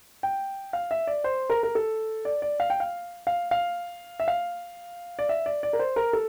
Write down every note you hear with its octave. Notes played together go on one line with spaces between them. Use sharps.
G5
F5
E5
D5
C5
A#4
A#4
A4
D5
D5
F5
G5
F5
F5
F5
E5
F5
D5
E5
D5
D5
A#4
C5
A#4
A4